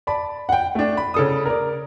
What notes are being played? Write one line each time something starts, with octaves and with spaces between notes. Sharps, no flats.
D5 A5 B5
F#5 G5
A3 D4
B5
C#3 A4 D#6
A#4 D5